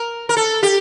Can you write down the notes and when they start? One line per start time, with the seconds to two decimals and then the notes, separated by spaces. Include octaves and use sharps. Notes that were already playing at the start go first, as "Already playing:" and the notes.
Already playing: A#4
0.29 A#4
0.37 A4
0.63 G4